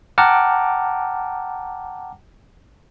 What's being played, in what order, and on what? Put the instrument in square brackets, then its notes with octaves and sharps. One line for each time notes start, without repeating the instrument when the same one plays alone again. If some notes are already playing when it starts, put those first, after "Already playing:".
[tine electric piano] F#5 G5 A5 A#5 D6 F6